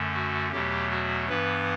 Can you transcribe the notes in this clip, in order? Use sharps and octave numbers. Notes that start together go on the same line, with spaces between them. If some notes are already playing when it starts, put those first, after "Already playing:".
Already playing: F#2 D3 A3
F#4
E2 B2 F#3 A3 G4
F#4
G2 E3 B3 B4